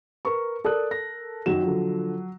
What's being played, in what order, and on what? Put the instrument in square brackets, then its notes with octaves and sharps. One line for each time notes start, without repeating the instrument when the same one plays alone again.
[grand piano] A#4 B4 [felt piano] C#6
[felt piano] A4 A#4 [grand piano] D5 D#6 F#6
[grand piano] A#6
[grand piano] F#2 D#3 E7 [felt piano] F#3
[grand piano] D3 F3